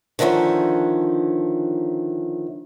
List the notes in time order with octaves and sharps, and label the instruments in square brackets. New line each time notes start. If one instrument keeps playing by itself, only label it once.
[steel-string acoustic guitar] D3 D#3 F3 A3 C#4